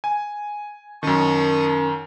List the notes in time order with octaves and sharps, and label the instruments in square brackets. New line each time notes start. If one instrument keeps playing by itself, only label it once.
[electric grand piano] G#5
[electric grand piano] F#2 D#3 [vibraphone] C#4 A#4 [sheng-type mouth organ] A5 C#6 D#6